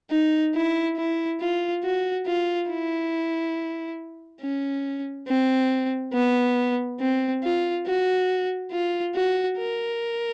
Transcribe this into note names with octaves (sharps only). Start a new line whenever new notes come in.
D#4
E4
E4
F4
F#4
F4
E4
C#4
C4
B3
C4
F4
F#4
F4
F#4
A#4